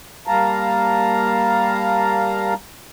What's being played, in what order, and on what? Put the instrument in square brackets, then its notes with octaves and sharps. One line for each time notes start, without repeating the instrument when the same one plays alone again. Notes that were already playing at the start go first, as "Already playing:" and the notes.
[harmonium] G3 A#3 F5 A5 A#5